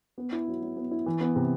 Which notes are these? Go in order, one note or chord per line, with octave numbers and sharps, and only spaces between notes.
B3
E4
F#3
F#3
B3
E4
E3
B3
C3